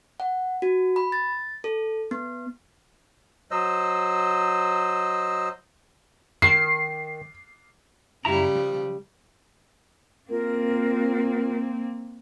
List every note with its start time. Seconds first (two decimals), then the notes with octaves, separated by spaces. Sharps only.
0.20 F#5
0.62 F#4
0.96 B5
1.12 A6
1.64 A4
2.11 B3
3.51 F#3 C5 D#5 E6
6.42 D#3 C7
8.25 F#2 C#3 G3 E4 A#5
8.55 F3
10.30 A#3 C4 F4 A#4